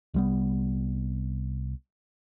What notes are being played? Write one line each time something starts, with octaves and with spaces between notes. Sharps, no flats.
C2 G3 B3